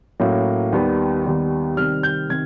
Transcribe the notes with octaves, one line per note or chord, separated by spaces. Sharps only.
A2 F#3 A#3 C#4
D#2 D#3 G3 B3
D#2 D#3 G3 B3
C3 D#3 G3 C4 F6
G6
C3 D#3 G#6